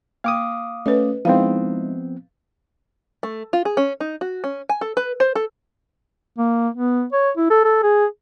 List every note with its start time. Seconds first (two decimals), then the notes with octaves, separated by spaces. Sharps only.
0.24 A#3 F5 D6 D#6
0.86 A3 C#4 B4 D#5
1.25 F3 G#3 B3 C4 D#4 E4 F5
3.23 A3
3.53 F4
3.65 G#4
3.77 C#4
4.00 D#4
4.21 F#4
4.44 C#4
4.69 G#5
4.81 A4
4.97 B4
5.20 C5
5.35 A4
6.38 A#3
6.74 B3
7.12 C#5
7.37 E4
7.50 A4
7.64 A4
7.83 G#4